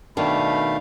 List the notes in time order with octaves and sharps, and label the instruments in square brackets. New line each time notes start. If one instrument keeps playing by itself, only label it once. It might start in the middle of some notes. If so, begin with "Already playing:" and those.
[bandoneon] B2 A3 F5 [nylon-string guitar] D#3 [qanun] D4 [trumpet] B5